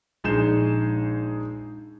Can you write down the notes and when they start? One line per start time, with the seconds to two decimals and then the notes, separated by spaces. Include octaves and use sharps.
0.24 A#1 G#3 D#4 G#4 G6 E7